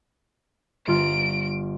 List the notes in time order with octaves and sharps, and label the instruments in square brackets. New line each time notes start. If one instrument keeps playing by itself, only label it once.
[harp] G1 F4 F6 [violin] D7